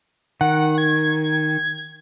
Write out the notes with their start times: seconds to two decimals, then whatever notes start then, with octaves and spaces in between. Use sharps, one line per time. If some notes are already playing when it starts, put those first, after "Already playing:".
0.41 D#3 F#5
0.78 G#6